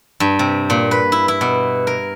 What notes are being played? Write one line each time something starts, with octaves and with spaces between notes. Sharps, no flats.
G2
C3
A#2
B4
E4
E4
B2
A#4